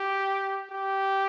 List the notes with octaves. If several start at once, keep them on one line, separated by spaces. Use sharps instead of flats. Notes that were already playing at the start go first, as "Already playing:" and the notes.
Already playing: G4
G4